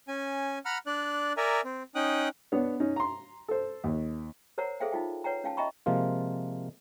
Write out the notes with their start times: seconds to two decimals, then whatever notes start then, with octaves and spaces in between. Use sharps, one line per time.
0.08 C#4 G#5
0.65 F#5 A#5 B5 F6
0.86 D4 D5 F#6
1.37 A#4 D5 E5 G#5 A#5
1.64 C4
1.95 C#4 D#4 G5 D#6 F#6
2.52 B3 D4 C#5
2.80 C#4 D#4
2.96 A#5 C6
3.48 A4 C5
3.84 D#2
4.58 A#4 C5 C#5 F#5 A#5
4.80 G#4 A4 C5 E5 F5 G5
4.92 D#4 F4 G5
5.24 B4 C#5 F#5 G5 A#5
5.44 C#4 F5 G5 A5
5.57 D#5 E5 G5 A#5 B5 C#6
5.86 C3 F3 G#3 A#3 F4